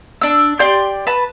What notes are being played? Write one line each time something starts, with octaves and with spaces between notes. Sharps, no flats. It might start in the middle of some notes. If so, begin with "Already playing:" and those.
D4 E6
G4 D5 C6 G6
B4 A5